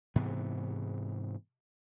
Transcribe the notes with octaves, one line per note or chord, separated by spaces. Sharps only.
G#2 C3 E3 B3